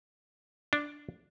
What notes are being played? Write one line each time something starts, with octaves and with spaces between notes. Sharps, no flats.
D4